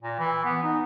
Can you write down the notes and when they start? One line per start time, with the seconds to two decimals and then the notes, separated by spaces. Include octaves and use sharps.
0.03 A#2
0.19 E3
0.45 B3
0.63 D#4